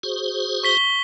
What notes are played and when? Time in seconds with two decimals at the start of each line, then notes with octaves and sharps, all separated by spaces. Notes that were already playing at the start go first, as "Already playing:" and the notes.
0.03 F#4 G#4 C5
0.63 C#6 B6 G7